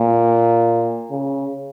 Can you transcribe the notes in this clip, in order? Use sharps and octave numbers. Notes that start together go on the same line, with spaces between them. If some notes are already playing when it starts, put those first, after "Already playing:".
Already playing: A#2
C#3